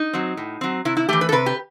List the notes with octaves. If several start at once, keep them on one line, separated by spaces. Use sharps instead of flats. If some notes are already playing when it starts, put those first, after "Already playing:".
Already playing: D#4
F#3 C4
A2
F#3 C4
C3 E4
E4
E3 A3 G4
B4
A4
C3 B4
G4